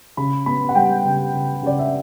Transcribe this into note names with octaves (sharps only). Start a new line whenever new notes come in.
C#3 B5
B3 B5
F#5
G3 G5
C#3
C#3
C#3 D5
E5